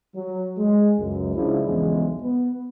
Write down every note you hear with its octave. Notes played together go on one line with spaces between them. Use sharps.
F#3
G#3
C#2 F#2
G#2 C#3 F3 D4 E4
B1 E2 C#3 E3 F3 G#3
B3